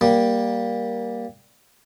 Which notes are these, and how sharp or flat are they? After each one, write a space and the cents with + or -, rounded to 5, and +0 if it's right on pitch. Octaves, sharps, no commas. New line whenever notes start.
G3 +0 A#3 +15